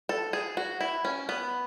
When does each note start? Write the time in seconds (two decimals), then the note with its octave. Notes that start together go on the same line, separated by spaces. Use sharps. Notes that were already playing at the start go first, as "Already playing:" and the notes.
0.09 A4
0.33 G#4
0.57 F#4
0.81 E4
1.05 C#4
1.29 B3